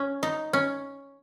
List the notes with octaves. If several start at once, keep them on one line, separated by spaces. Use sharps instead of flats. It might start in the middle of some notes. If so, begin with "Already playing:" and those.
Already playing: C#4
D#4
C#4